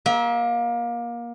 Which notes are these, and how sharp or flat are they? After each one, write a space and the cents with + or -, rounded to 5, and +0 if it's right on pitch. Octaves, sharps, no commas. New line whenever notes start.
A#3 +25 E5 -30